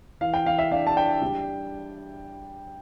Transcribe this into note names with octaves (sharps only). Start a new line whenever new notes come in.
E3 F5
G5
E3 F5
E5
D4 F5
A5
D4 G5
G3